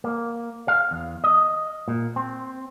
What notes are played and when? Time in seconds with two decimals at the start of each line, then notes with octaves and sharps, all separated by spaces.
0.04 A#3
0.68 F5
0.91 E2
1.24 D#5
1.88 A#2
2.16 C4